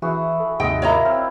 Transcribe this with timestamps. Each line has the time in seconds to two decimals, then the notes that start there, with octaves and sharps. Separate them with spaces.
0.02 E3 E4 F#4 G#4
0.40 A4
0.60 D#2 G#2 C3 G#3 A4 D#5 G5
0.82 A#3 E4 F4 C#5 D#5 A#5
1.05 C4 F6